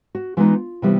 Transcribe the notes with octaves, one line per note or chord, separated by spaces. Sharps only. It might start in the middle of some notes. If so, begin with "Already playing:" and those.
F#4
E3 G#3 B3 D#4 F4
C3 E3 G3 B3 E4